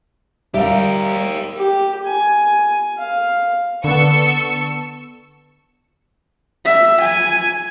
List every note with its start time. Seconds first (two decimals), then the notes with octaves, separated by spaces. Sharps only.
0.54 G3 G4 A#4 E5 F5
1.57 G4
2.06 G#5
2.98 F5
3.84 D3 B3 A4 C#6 E6
6.65 E5
7.01 G#5